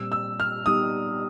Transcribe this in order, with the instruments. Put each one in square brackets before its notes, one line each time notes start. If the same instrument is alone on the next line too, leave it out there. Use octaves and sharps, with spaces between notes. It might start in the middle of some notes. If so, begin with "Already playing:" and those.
Already playing: [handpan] A#2 G3 C4 [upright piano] E6
[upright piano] E6
F6
[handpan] G3 B3 D#4 G4 [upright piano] D#6